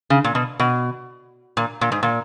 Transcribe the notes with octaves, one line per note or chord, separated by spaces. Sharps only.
C#3
A#2
B2
B2
A#2
A#2
G#2
A#2